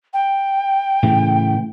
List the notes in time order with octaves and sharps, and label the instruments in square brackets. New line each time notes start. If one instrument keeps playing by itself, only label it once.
[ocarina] G5
[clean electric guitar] A2 C#3 E3